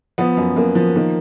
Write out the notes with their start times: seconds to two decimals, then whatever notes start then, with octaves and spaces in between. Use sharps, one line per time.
0.18 F3 B3
0.37 F#2
0.56 F#2 A#3
0.75 F3
0.96 D#3 A#3